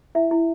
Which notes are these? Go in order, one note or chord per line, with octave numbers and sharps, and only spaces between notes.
E4 E5
E4